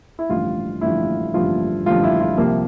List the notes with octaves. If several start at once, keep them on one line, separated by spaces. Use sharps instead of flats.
E4
A1 G2 D3 F3 F4
A1 G2 D3 F3 E4
A1 G2 D3 F3 F4
A1 G2 D3 F3 F4
E4
F4
C2 C3 F3 A#3